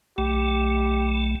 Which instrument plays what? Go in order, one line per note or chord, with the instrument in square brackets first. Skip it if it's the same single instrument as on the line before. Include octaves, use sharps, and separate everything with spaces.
[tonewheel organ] B1 A3 [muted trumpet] G4